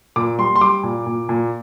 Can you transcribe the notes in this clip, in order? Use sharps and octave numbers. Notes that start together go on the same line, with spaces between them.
A#2 D6
G3 C6
C6
G3 D6
A#2
A#2
A#2